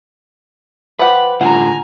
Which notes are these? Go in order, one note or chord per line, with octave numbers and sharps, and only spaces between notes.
F3 G4 B4 F#5
A2 D3 F4 F#5 G#5 A#5